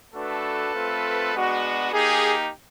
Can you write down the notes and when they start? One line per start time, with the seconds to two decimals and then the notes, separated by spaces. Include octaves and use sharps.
0.14 A3 D4 F#4 A4 B4
0.73 A3 C4 F4
1.33 G#3 B3 D4 F#4
1.92 A#3 D#4 G4 G#4